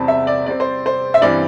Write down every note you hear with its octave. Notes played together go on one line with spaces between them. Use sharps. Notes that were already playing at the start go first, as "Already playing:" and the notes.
Already playing: E2 C3 G3 C4 A5 B5
E5
D5
C3 G3 C4 D5
C5
C5
E5
G2 E3 G3 C4 D5